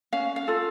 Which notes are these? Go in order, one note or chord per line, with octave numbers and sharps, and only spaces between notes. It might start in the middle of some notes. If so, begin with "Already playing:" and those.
C#4 F5
F5
F4 A4